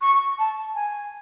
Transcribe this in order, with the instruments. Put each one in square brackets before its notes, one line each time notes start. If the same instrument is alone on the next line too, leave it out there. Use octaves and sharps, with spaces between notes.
[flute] C#6
A5
G#5